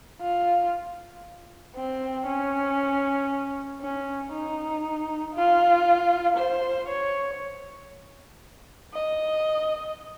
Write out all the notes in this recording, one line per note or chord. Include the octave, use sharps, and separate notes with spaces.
F4
C4
C#4
C#4
D#4
F4
C5
C#5
D#5